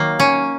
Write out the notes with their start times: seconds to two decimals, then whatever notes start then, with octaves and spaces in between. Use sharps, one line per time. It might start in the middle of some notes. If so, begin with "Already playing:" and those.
Already playing: D#3 F#3 A#3
0.20 C#4